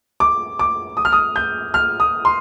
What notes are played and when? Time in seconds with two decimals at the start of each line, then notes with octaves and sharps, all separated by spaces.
0.20 D6
0.59 D6
0.97 D#6
1.05 F6
1.13 D#6
1.36 G6
1.74 F6
2.00 D#6
2.25 C6